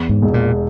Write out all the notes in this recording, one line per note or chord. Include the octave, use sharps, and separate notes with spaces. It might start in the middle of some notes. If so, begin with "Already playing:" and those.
Already playing: E2
G#2
E1
A#2